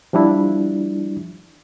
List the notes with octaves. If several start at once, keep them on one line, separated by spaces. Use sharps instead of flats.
F3 G3 D4 E4